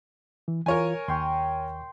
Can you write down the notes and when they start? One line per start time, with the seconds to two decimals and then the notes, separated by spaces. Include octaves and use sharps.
0.48 E3
0.66 E3 F4 A#4 C#5 G#5
1.08 D#2 G5 C6 C#6